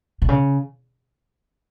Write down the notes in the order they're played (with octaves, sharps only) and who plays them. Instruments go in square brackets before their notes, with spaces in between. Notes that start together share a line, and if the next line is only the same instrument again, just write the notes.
[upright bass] B2
C#3